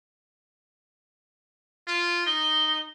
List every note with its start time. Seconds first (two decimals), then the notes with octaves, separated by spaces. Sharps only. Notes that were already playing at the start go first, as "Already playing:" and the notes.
1.87 F4
2.26 D#4 G7